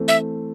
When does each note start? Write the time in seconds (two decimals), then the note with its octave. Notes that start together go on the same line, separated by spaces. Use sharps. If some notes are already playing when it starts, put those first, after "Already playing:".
Already playing: E3 A3 C4 A4
0.08 E5